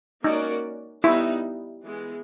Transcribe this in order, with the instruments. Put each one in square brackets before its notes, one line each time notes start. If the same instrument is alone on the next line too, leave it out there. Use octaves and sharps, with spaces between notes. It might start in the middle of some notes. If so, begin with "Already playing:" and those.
[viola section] A#3 C#4 F#4 A#4 D5 [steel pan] D#4
[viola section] G3 B3 D#4 [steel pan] E4
[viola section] E3 G#3 B3